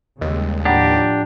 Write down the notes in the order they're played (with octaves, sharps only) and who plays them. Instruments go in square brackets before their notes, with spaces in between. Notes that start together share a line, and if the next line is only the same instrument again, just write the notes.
[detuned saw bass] D#2 [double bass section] C#3 G3 G#3 [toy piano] D#5 E6
[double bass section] A2 F3 [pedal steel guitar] D4 G4 [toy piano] F#5 A#5 B5